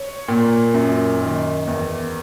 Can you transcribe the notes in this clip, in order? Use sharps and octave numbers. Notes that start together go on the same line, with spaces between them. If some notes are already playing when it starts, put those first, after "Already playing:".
Already playing: C#5
A#2
F#2
D#3
E2